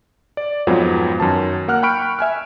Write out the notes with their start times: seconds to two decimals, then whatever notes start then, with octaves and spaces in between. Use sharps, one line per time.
0.37 D5
0.67 F2 G#2 F#3 B3 F4
1.20 F#2 D#3 A5
1.68 A#3 F#5 F6 F#6
1.83 G5 B5 C#6 F6 D7
2.19 E5 G#5 F6